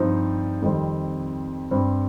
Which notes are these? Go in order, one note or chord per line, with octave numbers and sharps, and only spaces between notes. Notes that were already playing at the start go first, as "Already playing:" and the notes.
Already playing: G2 F3 C4 D#4
F2 D#3 G3 C4
G2 G3 C4